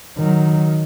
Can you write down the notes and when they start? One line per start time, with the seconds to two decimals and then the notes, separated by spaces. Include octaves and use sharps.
0.18 D#3 F#3